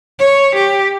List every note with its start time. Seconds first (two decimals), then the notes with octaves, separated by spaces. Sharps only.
0.19 C#5
0.55 G4